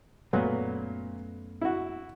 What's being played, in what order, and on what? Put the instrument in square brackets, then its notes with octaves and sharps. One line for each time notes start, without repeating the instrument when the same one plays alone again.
[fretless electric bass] F#2 A3 B3 [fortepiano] A#2 F#3
[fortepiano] E4 F#4